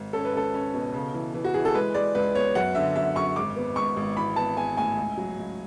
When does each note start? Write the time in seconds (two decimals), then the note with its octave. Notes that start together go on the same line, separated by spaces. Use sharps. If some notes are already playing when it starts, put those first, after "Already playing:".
Already playing: G#1
0.13 C#4 A4
0.25 B4
0.33 C#2 A4
0.54 C#4
0.74 B2
0.94 C#3
1.14 E3
1.34 E3
1.45 F#4
1.54 E3 G#4
1.65 A4
1.74 G#3 B4
1.94 G#3 D5
2.15 C#2 B4
2.35 B3 C#5
2.55 F#2 F#5
2.75 D3 E5
2.95 F#2 E5
3.16 F#2 C#6
3.36 G#1 D6
3.56 B3
3.76 G#2 C#6
3.96 G#1
4.17 E3 B5
4.36 B3 A5
4.57 B3 G#5
4.77 A2 G#5
4.97 C#2
5.17 F#3
5.38 C#2